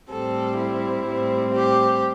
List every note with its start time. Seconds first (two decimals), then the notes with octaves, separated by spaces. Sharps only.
0.11 A2 G3 C4 A4
0.58 E4
1.06 A2 G3 C4
1.55 G4